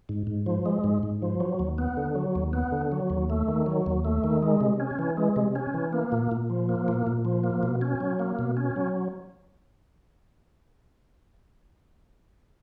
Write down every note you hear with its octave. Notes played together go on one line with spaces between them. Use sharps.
G#2
G#2
F3
G#3
G#2
G#2
F3
F#3
D#2
B3
D3
F#3
D#2
B3
D3
F#3
D#2
A3
D#3
F#3
D#2
A3
D#3
G#3
C3
C#4
E3
G#3
C3
C#4
E3
A#3
A#2
A#2
F3
A#3
A#2
A#2
F3
A#3
B2
C#4
F#3
A#3
B2
C#4
F#3